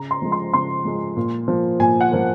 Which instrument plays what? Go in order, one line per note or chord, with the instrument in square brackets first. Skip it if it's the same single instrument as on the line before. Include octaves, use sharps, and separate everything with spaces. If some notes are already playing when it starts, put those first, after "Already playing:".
Already playing: [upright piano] C#3 A#5
C6
F3 G#3
C6
C#3 C6
F3 G#3
A#2
F3 A#3
A#2 G#5
F#5
F3 A#3